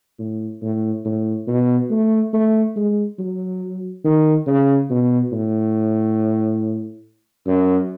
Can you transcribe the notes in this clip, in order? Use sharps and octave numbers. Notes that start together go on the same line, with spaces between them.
A2
A2
A2
B2
A3
A3
G#3
F#3
D#3
C#3
B2
A2
F#2